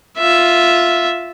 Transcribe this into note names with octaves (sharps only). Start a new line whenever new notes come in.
F4 E5